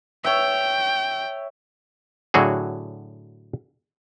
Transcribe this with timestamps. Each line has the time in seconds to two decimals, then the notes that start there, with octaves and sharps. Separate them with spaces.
0.24 C#5 E5 G5
2.34 A2 D3 F#3 F#4 G#4